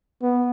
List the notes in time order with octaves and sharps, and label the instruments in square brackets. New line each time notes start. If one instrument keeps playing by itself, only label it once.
[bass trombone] B3